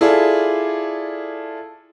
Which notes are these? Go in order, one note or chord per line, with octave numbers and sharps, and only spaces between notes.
E4 F4 G#4 A4 D5